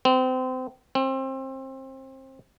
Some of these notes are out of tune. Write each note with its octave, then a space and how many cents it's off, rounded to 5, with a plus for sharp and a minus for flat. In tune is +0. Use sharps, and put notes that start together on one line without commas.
C4 -30
C4 +25